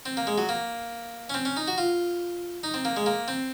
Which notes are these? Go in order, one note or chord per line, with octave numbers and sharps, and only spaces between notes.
C4
A#3
G#3
F#3
A#3
C#4
C4
C#4
D#4
F#4
F4
D#4
C4
A#3
G#3
A#3
C4